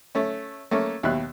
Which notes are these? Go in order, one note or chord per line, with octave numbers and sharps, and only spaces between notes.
A3 C#4
A3 A#3 C#4 C#5
D#2 B2 E5 F#6